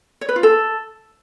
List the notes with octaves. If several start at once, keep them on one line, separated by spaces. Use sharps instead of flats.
C#5
B4
F4
A4